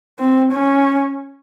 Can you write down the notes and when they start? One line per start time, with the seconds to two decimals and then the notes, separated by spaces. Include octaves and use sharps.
0.19 C4
0.52 C#4